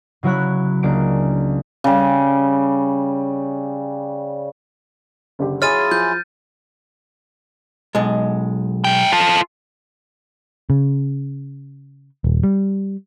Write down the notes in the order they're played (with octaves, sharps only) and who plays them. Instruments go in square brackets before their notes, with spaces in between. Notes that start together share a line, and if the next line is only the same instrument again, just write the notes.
[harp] C#3 F#3 E4 C#5 F#6
C#2 A#3 D4 D7
[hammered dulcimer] C#3 G3
[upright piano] F#1 D3 G4
[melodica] F#3 E4 F4 [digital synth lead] G#4 [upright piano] C#5 [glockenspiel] F6 A6 D#7
[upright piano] F3 [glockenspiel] G6
[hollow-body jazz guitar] B1 G#3
[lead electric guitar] G#2 G5
F4 A4
[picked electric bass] C#3
D#1
G3